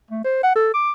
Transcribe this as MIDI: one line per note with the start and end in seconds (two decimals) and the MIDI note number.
0.11 0.22 57
0.24 0.40 72
0.43 0.53 78
0.55 0.71 69
0.74 0.92 86